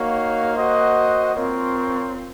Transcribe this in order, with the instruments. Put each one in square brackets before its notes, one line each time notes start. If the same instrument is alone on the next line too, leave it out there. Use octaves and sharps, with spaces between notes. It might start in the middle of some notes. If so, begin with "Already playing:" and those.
Already playing: [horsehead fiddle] A#3 [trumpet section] D#4 F#4 C#5 F5
[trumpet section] F#4 C5 D#5 F#5
[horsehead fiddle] C4 [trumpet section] F4 A#4 C#5